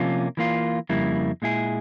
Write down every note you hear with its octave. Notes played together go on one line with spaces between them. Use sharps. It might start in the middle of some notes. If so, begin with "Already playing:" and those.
Already playing: C3 F3 A#3 C#4 F4
E3 A#3 F4
F2 C#3 G3 A#3 E4
A#2 G#3 E4 G#4